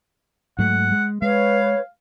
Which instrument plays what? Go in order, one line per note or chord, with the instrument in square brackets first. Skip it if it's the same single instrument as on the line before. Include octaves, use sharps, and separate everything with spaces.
[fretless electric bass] G#2 F#3 A3 [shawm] F#5
[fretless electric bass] G#3
[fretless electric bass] G#3 [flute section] B4 C#5 [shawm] F5